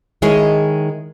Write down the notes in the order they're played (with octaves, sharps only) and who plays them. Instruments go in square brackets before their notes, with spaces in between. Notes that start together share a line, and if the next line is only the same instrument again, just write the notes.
[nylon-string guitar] D#3 G#3 E4 G#4 C#5